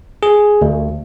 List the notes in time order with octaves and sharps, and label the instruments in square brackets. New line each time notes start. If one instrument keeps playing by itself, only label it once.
[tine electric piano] G#4
D2